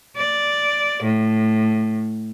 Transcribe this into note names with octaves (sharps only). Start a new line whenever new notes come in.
D5
A2